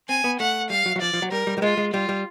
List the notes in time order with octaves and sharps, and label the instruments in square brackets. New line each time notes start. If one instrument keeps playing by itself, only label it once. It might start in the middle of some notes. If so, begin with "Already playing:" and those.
[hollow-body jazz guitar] C4 [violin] G#5
[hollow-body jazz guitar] B3
[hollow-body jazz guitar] A3 [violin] F#5
[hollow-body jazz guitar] G3 [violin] F5
[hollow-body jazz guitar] F#3
F#3
[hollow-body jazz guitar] F3 [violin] D5
[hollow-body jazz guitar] F3
F#3
[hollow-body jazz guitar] G3 [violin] A#4
[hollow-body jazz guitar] G3
G3
[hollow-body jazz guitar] G#3 [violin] F4
[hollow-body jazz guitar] G#3
[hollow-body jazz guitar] G3 [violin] F4
[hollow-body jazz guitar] G3